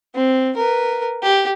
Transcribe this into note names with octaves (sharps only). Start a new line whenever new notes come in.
C4
A#4 B4
G4